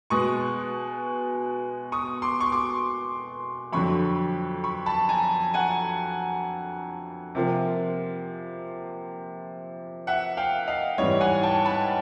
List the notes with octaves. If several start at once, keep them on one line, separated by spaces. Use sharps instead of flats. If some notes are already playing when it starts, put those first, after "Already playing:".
B2 G#3 B3 C#6 D#6
C#6 D#6
C6 D6
C#6
C6 D6
F2 D3 F#3 B5 C#6
B5 C#6
A5 B5
G#5 A#5
F#5 G#5
C3 F3 A#3
E5 F#5
F5 G5
D#5 F5
G#2 E3 G3 C#5 D#5
F#5 G#5
G5 A5
A5 B5